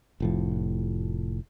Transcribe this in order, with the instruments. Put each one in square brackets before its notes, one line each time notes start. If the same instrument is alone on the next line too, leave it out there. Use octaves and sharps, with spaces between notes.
[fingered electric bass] F1 A2 F3